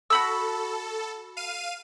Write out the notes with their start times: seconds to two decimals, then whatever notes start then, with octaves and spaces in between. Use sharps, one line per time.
0.10 F#4 A4 B5 E6
1.37 F5 D#7